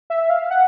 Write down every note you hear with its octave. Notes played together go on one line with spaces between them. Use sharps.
E5
F5
F#5